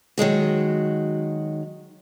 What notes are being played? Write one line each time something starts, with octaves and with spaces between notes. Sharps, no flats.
D#3 F#3 G#3 F#4